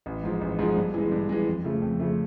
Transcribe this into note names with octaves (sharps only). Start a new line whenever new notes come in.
A1
G#2 F3
A1
G#2 F3
G2
E3 G#3
G2
E3 G#3
F2
C#3 F3 A3
F2
C#3 F3 A3